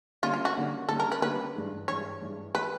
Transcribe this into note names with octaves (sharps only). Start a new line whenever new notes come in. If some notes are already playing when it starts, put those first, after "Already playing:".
D3 G3 A#3 C#4 F4
F4
F#4
D3 G3 A#3 C#4
D3 G3 A#3 C#4 A4
A#4
B4
D3 G3 A#3 C#4 B4
G2 E3 G#3
G2 E3 G#3 C#5
G2 E3 G#3
E3 G#3 B4